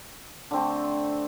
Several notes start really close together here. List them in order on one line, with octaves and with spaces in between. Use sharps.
D3 C4 A3